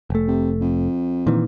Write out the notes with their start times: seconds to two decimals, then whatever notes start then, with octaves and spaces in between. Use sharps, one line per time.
0.10 F1 A3
0.28 C3
0.61 F2
1.27 A#2 D#3 E3